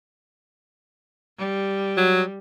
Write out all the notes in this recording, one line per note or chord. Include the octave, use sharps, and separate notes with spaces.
G3
F#3